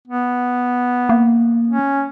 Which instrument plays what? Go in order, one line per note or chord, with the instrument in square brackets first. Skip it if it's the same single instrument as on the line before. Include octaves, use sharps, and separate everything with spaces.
[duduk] B3
[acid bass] A#3
[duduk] C#4